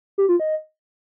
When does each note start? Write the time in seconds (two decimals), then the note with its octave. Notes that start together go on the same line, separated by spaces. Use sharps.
0.18 G4
0.29 F4
0.40 D#5